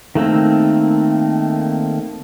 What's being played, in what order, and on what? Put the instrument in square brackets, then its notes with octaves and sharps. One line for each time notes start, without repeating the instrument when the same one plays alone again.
[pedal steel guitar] D#3 A3 A#3 C4